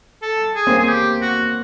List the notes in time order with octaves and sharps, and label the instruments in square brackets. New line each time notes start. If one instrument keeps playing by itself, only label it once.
[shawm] A4
G#4
[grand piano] A#3 C4
[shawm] G#4
G4
F#4